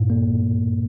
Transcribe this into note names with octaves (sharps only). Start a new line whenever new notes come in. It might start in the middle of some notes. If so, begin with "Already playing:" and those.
Already playing: G2 A#2
A#3